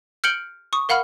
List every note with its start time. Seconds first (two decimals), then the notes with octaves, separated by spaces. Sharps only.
0.24 F6 G6 C#7 D7 F#7 G7
0.73 C#6 D#6
0.89 A#4 F5 F#5 B5 F6